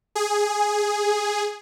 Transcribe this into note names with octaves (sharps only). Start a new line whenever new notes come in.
G#4